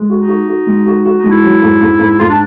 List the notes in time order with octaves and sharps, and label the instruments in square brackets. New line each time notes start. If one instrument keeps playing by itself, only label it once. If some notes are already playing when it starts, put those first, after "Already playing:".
Already playing: [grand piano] G#3
F#4
[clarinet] D#4
[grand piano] F#4
F#4
G#3
F#4
F#4
[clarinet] D#4
[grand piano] G#3
[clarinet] E4
[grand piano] F#3
G#2
G#2
G#2
[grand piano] G#2 [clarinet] F4
[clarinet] D4